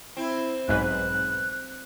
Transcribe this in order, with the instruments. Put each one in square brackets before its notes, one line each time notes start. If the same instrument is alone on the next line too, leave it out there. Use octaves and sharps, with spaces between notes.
[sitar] C4 [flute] E4
[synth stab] B1 G#2 B4 [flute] F#6